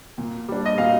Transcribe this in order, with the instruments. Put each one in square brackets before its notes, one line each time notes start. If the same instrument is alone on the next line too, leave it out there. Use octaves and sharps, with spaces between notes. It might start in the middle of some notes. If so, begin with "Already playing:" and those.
[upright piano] A#2
G3 D4
D#5
A#2 F5